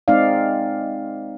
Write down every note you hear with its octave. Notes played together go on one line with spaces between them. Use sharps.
G#3 C4 D#4 D5 F5